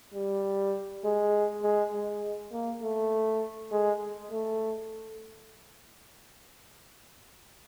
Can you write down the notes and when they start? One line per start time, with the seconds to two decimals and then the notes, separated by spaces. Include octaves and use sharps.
0.14 G3
1.04 G#3
1.63 G#3
1.93 G#3
2.52 A#3
2.82 A3
3.71 G#3
4.31 A3